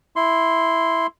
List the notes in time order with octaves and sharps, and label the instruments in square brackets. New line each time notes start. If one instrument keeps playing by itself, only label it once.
[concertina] E4 C6